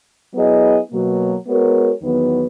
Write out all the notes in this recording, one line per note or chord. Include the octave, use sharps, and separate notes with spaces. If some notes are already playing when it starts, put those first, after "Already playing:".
F#3 B3 E4 G#4 D#5
B2 F#3 A#3
G#3 B3 F#4 A#4 C#5
E2 D#3 F#3 B3